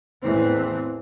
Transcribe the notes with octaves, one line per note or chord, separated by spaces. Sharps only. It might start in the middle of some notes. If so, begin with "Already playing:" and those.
A1 E2 A2 E3 C4